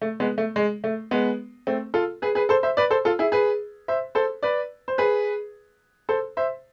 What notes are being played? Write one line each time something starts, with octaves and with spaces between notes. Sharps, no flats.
A3
G#3 B3
A3
G#3
A3
G#3 B3
A3 C4
F4 A4
G#4 B4
G#4 B4
A4 C5
C5 E5
B4 D5
A4 C5
F4 A4
E4 G#4
G#4 B4
C5 E5
A4 C5
B4 D5
C5
G#4 B4
A4 C5
C5 E5